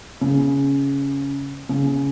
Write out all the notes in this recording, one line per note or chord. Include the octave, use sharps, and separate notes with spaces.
C#3
C#3